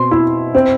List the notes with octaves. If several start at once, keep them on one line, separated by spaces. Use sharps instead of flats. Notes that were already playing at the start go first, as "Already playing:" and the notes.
Already playing: B2 C4 C6
E4
C4